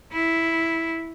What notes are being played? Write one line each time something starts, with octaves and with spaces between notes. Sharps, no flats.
E4